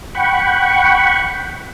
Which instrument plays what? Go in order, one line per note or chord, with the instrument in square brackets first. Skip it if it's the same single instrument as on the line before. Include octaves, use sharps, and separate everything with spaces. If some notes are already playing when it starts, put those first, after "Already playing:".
[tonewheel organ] F#5 G5 B5 C#6